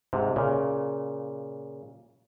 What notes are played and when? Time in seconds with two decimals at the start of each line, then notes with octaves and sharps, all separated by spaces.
0.13 G#2 C3
0.36 A#2 C#3